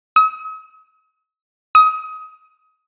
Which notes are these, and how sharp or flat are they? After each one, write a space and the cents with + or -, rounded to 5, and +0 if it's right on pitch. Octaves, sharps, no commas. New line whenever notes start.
D#6 +45
D#6 +25